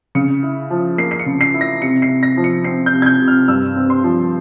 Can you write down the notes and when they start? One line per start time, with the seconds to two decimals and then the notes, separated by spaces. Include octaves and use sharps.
0.15 C#3 C#7
0.43 E4
0.71 F3
0.98 A#3 C7
1.11 C7
1.19 C#7
1.26 C#3
1.41 C7
1.54 E4
1.61 A#6
1.82 C3 C#7
2.02 C7
2.09 C3
2.23 A#6
2.37 F3
2.44 C#7
2.64 C4 C7
2.86 G6
2.93 C3
3.02 G#6
3.06 G6
3.20 C3
3.28 F6
3.48 G2 E6
3.76 C4
3.90 C6
4.04 F3